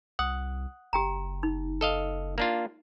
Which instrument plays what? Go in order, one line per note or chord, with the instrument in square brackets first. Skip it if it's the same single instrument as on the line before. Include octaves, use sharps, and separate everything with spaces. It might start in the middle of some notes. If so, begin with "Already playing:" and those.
[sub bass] C2 [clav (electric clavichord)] F#5 [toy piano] D#6
[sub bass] F#1 [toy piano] G4 G5 A#5
[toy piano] D#4
[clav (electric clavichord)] A4 D#5 F5
A#3 D4 F4